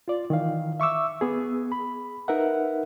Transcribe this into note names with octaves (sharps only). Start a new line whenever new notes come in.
F4 D5
D#3 E3 F5
E5 C#6 D6 E6
B3 G#4
B5
D#4 A#4 B4 E5 F#5